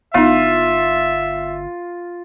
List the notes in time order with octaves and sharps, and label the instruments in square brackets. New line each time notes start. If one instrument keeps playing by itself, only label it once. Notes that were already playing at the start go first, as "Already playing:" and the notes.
[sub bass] G1 [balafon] B3 D#4 [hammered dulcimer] F4 [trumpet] E5